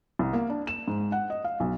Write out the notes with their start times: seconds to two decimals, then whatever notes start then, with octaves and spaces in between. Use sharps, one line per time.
0.19 C2
0.33 A#3
0.50 D4
0.67 E7
0.88 G#2
1.12 F#5
1.30 D#5
1.44 F5
1.60 B1